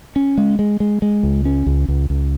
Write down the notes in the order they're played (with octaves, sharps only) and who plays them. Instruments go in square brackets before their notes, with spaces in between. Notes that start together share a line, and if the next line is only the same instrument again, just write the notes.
[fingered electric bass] C#4
G#3
G#3
G#3
G#3
C#2
C#4
C#2
C#2
C#2